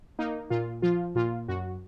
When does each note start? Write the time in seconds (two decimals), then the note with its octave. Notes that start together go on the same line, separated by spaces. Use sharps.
0.19 A#3 D#4
0.50 A#2 F4
0.82 F3 F4
1.15 A#2 F4
1.48 F#2 F#4